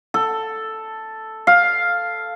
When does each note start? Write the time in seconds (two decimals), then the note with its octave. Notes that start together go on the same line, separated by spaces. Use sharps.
0.14 A4
1.47 F5